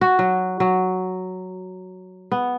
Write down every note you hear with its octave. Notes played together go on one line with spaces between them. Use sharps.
F#4
F#3
F#3
B3